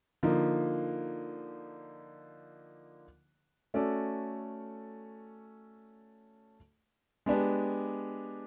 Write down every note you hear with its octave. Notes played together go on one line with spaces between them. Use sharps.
D3 F3 A#3 D#4
A3 C#4 F#4 A4 D5
G#3 B3 D4 G4